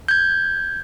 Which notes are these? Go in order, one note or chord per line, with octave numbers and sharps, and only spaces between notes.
G6 G#6